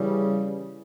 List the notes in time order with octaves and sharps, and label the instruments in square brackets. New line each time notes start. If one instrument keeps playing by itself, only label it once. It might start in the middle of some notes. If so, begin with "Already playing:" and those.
Already playing: [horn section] C#3 E3 G3